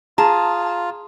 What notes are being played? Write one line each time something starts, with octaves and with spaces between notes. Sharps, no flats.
F4 G#4 A5 A#5